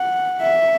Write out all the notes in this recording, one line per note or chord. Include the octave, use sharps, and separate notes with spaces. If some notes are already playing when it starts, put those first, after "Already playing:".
Already playing: F#5
E5